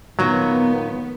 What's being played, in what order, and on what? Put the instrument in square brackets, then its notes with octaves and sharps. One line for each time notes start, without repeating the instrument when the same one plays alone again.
[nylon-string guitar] A#2 D#3 A#3 [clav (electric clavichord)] F#3 [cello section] B3